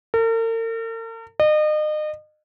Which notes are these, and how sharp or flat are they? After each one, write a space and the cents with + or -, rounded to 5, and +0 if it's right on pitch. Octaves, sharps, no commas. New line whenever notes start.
A#4 -45
D#5 -35